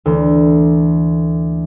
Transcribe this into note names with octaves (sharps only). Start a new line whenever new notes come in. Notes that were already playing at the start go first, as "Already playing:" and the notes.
D2 E3